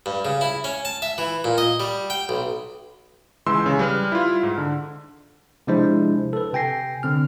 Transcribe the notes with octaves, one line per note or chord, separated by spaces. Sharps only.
G2
C#3
E4
C#4
A5
E5
E3
A#2
D#5
G3
G5
B1
C#2 E3 G#3 C6 E6
C#3
G3 B4 F6
E4 F4
G#2
D3
C3 F3 G#3 D4 E4 C5
A4 B4
C3 G5 G#5 A#6 C7
D3 C4 F6